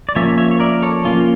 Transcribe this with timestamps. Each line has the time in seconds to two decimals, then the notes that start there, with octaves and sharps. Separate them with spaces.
0.09 D5
0.15 F3 A#3 C#4 C#5 E5
0.38 C#5 E5
0.51 C#5
0.60 A#4 D5
0.82 A4 C#5
1.05 F3 A#3 C#4 F4